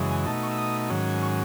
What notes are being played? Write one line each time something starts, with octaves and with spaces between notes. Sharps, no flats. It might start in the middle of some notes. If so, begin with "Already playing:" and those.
Already playing: F#2 C#3 E3 G#3
G#5
B2 A3 D#4 A5
C#6
E6
D#6
G#2 D#3 F#3 C#4
C#6